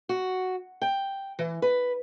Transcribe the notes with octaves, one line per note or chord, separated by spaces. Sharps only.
F#4
G5
E3
B4